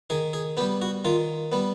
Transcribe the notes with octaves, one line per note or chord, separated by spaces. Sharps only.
D#3 G#4
G#4
G3 B3 G4
F#4
D#3 F4
G3 B3